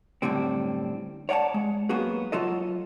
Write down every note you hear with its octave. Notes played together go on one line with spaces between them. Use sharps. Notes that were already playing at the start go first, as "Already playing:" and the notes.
F#2 A2 D3 G3 C4
C#5 D5 F#5 G#5 A5
G#3
F#3 A#3 B3 F#4 G#4
F#3 F4 A4 D#5